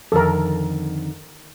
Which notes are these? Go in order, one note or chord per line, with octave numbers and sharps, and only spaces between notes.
F2 D3 D#3 A4 A#4